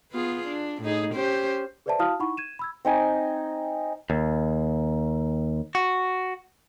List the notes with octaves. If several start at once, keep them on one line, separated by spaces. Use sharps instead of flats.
B3 F4 G#4
D4
A2 D#4 G#4
C#4 G4 C5
G#4 B4 C5 D5 E5 A5
E4 F#4 F5 A5 D#6 F6
D#4 E4 F#5 B5 C#6
G#6 D#7 E7
B5 E6 G#6
C4 D#4 G#5
D#2
F#4